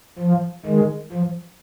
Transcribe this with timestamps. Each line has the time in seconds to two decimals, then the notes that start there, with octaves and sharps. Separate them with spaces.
0.19 F3
0.66 D#3 G#3
1.13 F3